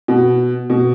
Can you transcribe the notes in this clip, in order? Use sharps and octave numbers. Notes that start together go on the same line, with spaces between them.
B2
B2